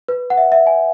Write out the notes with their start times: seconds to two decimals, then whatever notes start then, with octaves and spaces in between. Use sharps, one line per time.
0.08 B4
0.30 F#5
0.37 E5
0.52 E5
0.67 G#5